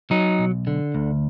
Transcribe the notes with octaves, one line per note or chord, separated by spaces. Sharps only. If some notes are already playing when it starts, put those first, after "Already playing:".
F#3 D#4
B1
D3
D2